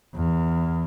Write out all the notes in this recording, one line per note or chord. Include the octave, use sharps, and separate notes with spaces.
E2